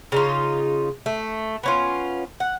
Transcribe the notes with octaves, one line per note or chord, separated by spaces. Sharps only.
C#3 D#4 F4
A3
B3 C#4 F4
F#5